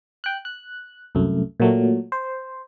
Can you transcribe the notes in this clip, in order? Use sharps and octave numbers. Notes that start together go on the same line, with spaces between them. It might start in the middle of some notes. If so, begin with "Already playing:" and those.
G5 F#6
F#6
C2 F#2 A3
A#2 F#3 A3
C5